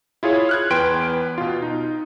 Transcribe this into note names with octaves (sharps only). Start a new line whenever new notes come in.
E4 F4 G#4 C#5
F6 F#6 G#6
E2 B4 G5 C6 D7
B2 F4
D#4